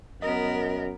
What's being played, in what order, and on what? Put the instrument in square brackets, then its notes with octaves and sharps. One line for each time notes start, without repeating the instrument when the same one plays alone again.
[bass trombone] F#2 [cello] B3 A#4 [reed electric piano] D#5